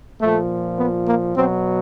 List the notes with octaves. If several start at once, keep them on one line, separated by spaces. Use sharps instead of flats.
A#2 F3 A3
B3
A#3
B2 F#3 C4